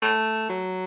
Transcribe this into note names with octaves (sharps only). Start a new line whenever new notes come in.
A3
F#3